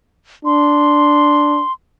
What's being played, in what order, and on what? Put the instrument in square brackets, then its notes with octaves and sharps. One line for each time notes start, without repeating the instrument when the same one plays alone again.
[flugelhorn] D4 [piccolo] C6